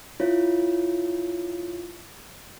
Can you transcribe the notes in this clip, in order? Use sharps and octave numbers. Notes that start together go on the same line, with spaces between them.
E4 F4 C#5